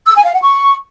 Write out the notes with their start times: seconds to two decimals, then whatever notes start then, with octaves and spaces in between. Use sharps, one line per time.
0.06 E6
0.15 G#5
0.24 F5
0.33 F#5
0.42 C#6